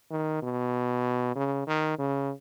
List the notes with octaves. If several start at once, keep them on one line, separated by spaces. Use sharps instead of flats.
D#3
B2
C#3
D#3
C#3